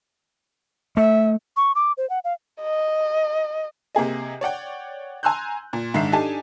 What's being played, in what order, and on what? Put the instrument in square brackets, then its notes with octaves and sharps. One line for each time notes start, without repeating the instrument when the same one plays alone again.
[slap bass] A3 [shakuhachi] E5
[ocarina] C#6
D6
C5
F#5
F5
[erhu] D#5
[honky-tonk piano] C3 A#3 G#4 D#5
C#5 D5 F#5 G5
G#5 A#5 C6 E6 F#6 G6
A#2
G#2 D#3 D4 E5 C7
D4 D#4 G4 A4 G#5 A5